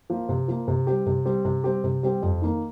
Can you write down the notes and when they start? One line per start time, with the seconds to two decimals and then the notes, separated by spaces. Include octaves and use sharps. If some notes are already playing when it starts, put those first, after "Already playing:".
0.10 F3 A#3
0.29 C3
0.48 F3 A#3
0.68 C3
0.87 G3 C4 G4
1.07 C3
1.25 G3 C4 G4
1.45 C3
1.64 G3 C4 G4
1.84 C3
2.03 G3 C4 G4
2.23 F2
2.42 D#3 A#3